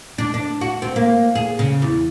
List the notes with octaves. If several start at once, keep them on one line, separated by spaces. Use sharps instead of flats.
D4
D4
F#4
C4
A#3
G#4
C#3
E2